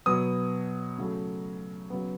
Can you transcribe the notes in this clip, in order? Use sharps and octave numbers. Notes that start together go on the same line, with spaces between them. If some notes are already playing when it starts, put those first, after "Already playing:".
B2 F#3 B3 D#6
C#3 F#3 A3
C#3 F#3 B3